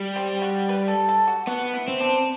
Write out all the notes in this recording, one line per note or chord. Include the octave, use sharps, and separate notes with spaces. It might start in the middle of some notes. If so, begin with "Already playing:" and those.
Already playing: G3
C4
F#4
B4
A4
A4
F#4
B3 F#4
E4
C4
D4